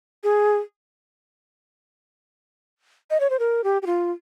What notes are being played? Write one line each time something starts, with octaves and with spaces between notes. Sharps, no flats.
G#4
D#5
C#5
C5
A#4
G4
G4
F4